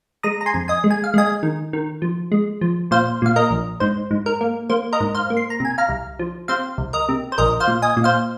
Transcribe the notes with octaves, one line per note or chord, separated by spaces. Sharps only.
G#3 A#5 D#6
A#5
G#5 C6
F2
D#5 G#5
G#3
G#5
F5
G#3 D#5 G#5
D#3
D#3
F3
G#3
F3
A#2 C5 F5
A#2 F5
A#4 D#5
A#1
G#2 C5
G#2
A#4
A#3
A#3 C5
A#4 D#5
G#2
C5 F5
A#3
C6
A#5
C3 G#5
F5 A#5
C2
F3
C3 C5 F5
C2
A#4 D#5
C3
C5
A#1 A#4 D#5
C5 F5
A#2
D#5 G#5
A#2
C5 F5